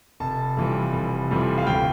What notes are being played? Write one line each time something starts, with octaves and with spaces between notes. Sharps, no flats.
F1 A5
F2 E3 G3
F1
F2 E3 G3
F5
D2 G5